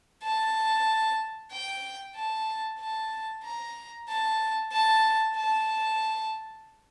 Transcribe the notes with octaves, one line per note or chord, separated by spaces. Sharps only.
A5
G5
A5
A5
A#5
A5
A5
A5